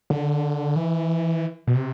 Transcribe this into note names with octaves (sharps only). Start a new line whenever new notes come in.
D3
E3
B2
C3